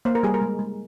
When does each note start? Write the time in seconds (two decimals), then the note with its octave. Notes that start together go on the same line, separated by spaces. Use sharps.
0.05 A#3 C5
0.15 A#4
0.23 G3 G#4
0.34 A#4
0.42 G#3
0.59 G#3